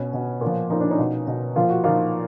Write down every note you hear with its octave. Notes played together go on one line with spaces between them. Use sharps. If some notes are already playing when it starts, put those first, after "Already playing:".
Already playing: B2 B3 C#4
B2
A#2
F3
A#2 F3 D#4
D4
C#4 D#4
B2
B2
A#2 F3 F4
F#4
A#2 F3 D#4 F4